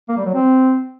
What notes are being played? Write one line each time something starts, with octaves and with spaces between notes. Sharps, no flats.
A#3
G3
F#3
C4